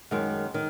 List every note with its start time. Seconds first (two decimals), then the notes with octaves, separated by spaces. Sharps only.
0.11 F#2 D#3 G#3
0.54 D#3